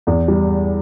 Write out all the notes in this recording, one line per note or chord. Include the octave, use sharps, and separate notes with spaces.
E2
G3